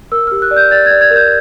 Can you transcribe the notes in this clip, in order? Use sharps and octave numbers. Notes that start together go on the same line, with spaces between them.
A#4 E6
G4 F6
F#6
D5
G6
D5 A6
G#6
D5
G#6
A#4
G6